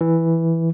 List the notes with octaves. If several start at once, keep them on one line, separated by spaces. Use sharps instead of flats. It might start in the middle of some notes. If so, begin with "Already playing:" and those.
E3